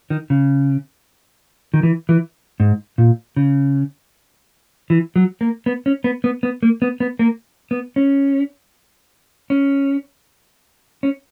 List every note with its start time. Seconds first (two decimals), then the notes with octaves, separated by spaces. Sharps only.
0.10 D#3
0.30 C#3
1.74 D#3
1.83 E3
2.09 E3
2.60 G#2
2.98 A#2
3.36 C#3
4.90 E3
5.16 F#3
5.41 A#3
5.66 B3
5.86 C#4
6.04 B3
6.24 B3
6.43 B3
6.63 A#3
6.82 B3
7.00 B3
7.19 A#3
7.71 B3
7.96 C#4
9.50 C#4
11.03 C#4